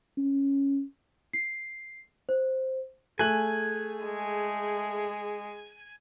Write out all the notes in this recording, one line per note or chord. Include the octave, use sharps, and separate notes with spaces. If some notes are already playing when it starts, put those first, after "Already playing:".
C#4
C7
C5
A3 G#4 G#5 F#6 F#7
G#3